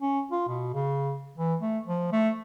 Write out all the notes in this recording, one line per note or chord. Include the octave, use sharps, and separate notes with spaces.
C#4
F4
B2
C#3
E3
A3
F3
A3